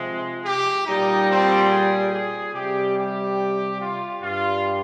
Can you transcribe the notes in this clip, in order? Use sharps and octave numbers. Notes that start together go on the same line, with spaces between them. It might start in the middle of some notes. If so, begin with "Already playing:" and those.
Already playing: C3 F3 G#3
G4
A#2 G3 D#4
C4
G#4
G#4
C3 G3 G4
G4
F4
G2 G3 F4